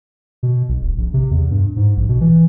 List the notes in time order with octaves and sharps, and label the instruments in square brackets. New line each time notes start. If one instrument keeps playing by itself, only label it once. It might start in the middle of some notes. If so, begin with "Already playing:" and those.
[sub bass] B2
B1
D1
A#1
C3
E2
G2
G#2
A#1
B2
E3